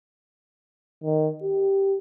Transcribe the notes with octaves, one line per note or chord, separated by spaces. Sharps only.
D#3
G4